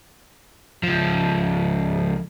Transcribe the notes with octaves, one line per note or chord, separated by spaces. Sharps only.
C#2 F3